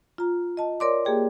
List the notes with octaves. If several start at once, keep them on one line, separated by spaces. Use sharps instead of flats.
F4 A#5
D#5 A5
A#4 C#5 D5 C6 D6
A#3 G4 G#4 G5